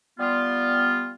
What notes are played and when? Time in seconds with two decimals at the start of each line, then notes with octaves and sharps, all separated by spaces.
0.19 G3 B3 F4